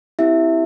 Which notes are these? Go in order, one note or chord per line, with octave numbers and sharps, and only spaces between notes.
C4 E4 G4 E5